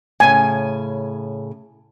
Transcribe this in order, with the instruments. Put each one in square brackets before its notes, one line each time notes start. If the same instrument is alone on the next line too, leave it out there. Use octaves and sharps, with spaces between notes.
[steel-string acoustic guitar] A2 C#3 [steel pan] G#5